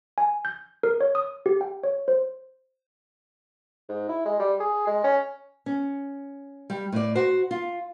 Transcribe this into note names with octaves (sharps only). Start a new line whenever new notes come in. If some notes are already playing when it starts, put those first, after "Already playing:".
G#5
G6
A#4
C#5
D#6
G4
G5
C#5
C5
G#2
E4
G#3
G3
G#4
G#3
C#4
C#4
G3
A2 D5
F#4 C5
F4